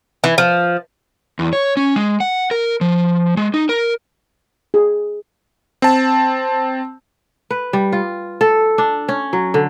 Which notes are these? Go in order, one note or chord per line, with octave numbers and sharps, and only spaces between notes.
E3
F3
E2
C#5
C#4
G#3
F#5
A#4
F3
G#3
D#4
A#4
G#4
C4 A5
B4
G3
F4
A4
D4
C#4
F#3
D3